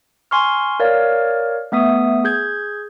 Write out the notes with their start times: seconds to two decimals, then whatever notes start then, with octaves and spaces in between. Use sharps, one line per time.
0.31 G#5 C6 C#6 F6
0.80 A#4 C#5 D5 F5
1.72 A3 B3 E5 D#6
2.24 G#4 G6 G#6